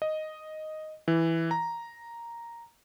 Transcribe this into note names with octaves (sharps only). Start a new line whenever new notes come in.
D#5
E3
A#5